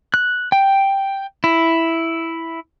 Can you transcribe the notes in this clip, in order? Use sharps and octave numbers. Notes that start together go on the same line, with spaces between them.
F#6
G5
E4